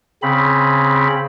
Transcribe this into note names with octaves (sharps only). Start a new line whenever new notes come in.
C#3 C4 B5